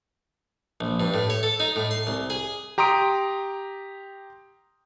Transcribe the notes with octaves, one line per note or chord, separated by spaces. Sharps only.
A#1
G2
A2
C#5
A4
D#4
A2
C6
C2
G#4
G4 A#5 C6 D#6 D7